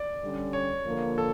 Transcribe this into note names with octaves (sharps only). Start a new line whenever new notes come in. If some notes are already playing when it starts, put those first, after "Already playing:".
Already playing: D5
D3 G3 C#4
C#5
D3 F3 A#3
A4